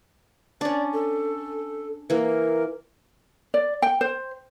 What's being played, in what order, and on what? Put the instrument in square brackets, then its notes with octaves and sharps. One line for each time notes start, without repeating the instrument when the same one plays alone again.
[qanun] C#4 D4 [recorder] D5
[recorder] A4
[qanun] E3 A#3 [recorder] A#4
[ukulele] D5
G5
C5